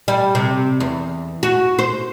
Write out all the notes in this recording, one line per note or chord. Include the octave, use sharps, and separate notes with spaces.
G3
C3
E2
F#4
C5